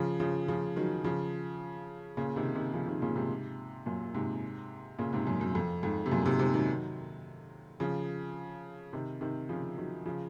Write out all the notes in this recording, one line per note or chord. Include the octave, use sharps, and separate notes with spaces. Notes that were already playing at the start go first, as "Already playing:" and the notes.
Already playing: C#3 F3
C#3 F3
C#3 F3
D#3 F#3
C#3 F3
A#2 C#3
C3 D#3
C3 D#3
C#3 F3
C3 D#3
A#2 C#3
G#2 C3
F#2 A#2
G#2 C3
A#2 C#3
G#2 C3
F#2 A#2
F#2
F2
F2 G#2
C3
F#2 A#2
G#2 C3
G#2 C3
D#3 F#3
C#3 F3
C3 D#3
C3 D#3
C#3 F3
D#3 F#3
C#3 F3